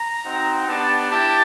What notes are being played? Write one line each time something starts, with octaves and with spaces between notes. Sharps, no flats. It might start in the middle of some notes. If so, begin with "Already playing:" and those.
Already playing: A#5
C4 D#4 F#4
B3 D4 G4 A5
E4 G4 A5